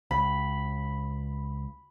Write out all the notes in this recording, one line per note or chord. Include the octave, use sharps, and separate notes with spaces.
C#2 B5